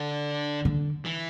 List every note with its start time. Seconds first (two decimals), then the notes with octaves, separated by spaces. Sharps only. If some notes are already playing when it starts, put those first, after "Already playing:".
Already playing: D3
0.65 D3
1.05 E3